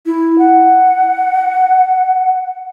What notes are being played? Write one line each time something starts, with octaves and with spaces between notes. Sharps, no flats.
E4
F#5